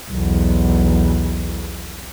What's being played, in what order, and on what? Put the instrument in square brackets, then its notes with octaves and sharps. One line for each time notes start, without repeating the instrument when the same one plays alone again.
[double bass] B1 E2